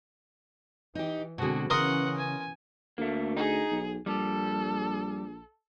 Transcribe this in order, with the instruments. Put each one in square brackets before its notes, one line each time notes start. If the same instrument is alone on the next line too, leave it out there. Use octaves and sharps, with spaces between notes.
[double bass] E3 [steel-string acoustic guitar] D#4 G4
[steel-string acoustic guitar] B2 D3 [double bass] G#3 C4 [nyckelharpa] F#4 G#4
[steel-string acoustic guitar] C#3 [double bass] E3 C#4 [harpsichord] A#4 C6 D#6 [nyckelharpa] F#5
[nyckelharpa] G#5
[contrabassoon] D2 [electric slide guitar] A3 A#3
[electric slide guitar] D#4 [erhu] G#4
[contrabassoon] B1
[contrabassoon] A#1 [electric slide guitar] G3 [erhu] A4